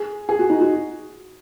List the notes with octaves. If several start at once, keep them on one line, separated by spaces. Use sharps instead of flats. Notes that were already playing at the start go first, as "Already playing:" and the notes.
Already playing: G#4
G#4
F#4
D#4
F#4